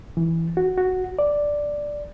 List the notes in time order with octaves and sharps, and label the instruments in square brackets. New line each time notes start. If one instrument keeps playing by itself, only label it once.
[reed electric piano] E3
F#4
F#4
D5